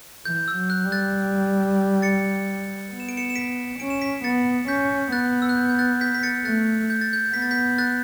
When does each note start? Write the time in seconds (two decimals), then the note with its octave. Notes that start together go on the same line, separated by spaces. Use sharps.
0.25 E3 G6
0.48 E6
0.55 F#3
0.70 F#6
0.85 G3
0.92 F#6 A6
2.02 A6 C#7
2.91 B3
3.00 E7
3.09 D7
3.17 C#7 E7
3.30 E7
3.36 B6 D7
3.80 C#4 D7
3.90 E7
4.01 B6 D7
4.24 B3 A6 C#7
4.68 C#4 G6 B6
5.12 B3 F#6 A6
5.42 E6
5.49 F#6
5.57 G6
5.69 G6
5.79 F#6 A6
6.01 G6 B6
6.15 B6
6.23 A6 C#7
6.45 A3 F#6 A6
6.90 G6
7.01 A6
7.13 G6
7.34 B3 B6
7.42 A6
7.51 G6 B6
7.78 F#6 A6